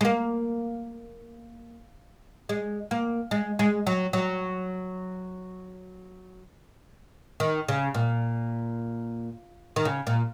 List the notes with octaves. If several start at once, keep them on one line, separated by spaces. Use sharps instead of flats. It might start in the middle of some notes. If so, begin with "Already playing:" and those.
G#3
A#3
G#3
A#3
G#3
G#3
F#3
F#3
D#3
C#3
A#2
D#3
C#3
A#2